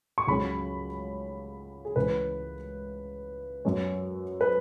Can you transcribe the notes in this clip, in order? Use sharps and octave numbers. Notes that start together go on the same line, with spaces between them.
C#6
C#2 C#3 F#3 C#4 B5
G#4
C#2 C#3 E3 C#4 B4
F#2 F#3 C#4
B4